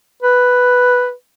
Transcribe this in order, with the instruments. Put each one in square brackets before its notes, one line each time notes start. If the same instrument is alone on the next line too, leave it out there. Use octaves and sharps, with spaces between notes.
[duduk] B4